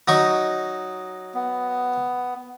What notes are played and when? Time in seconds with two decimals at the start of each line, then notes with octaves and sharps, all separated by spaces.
0.08 F#3 D#4 C#6
1.34 B3